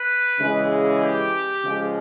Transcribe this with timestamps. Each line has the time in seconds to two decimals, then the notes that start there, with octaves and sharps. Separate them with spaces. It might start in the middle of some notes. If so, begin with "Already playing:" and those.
Already playing: B4
0.40 C#3 E3 G#3
1.01 G4
1.63 C#3 F3 G#3